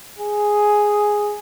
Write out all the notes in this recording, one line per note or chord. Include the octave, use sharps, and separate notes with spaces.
G#4